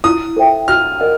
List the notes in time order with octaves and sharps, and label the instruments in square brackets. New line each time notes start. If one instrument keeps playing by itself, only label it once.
[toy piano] E4 [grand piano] D#6
[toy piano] A4 C5 E5 G5
[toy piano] F#4 [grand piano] F6
[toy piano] A#4 D#5 F#5